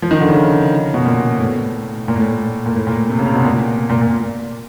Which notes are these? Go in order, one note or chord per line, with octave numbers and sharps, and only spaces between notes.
F3
D#3
D3
C#3
B2
A#2
A2
A#2
A2
A#2
A#2
A2
A#2
C3
C#3
C3
B2
A#2
A#2
A#2